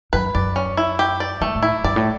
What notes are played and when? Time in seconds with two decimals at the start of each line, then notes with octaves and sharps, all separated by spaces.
0.13 F#2 B4
0.35 F#2 D5
0.56 C#4
0.77 E4
0.99 G4
1.20 D5
1.41 G2 A3
1.55 A2
1.62 E4
1.84 G2 D5
1.96 A2